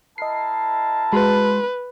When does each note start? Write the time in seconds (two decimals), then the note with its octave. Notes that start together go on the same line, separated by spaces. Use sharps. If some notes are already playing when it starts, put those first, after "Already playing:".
0.18 E4 A#4 D#5 A5 C7
1.13 G#3 F#4 B4 C6